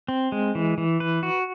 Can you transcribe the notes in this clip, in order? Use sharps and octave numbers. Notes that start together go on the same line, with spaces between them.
C4
G#3
E3
E3
B4
F#4